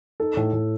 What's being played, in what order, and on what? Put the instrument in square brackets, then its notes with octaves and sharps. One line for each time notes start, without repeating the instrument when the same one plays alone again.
[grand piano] D#4 [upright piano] A4
[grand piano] A2
A2